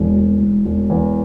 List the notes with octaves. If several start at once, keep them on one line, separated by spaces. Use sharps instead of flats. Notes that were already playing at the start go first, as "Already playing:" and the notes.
Already playing: E1 E2
E1
E1
E1
E2